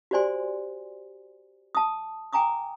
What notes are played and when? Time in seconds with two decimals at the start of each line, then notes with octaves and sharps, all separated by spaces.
0.11 F#4 G4 C5 D5 G#5 C6
1.75 A5 D#6
2.33 G5 G#5 A#5 D6 D#6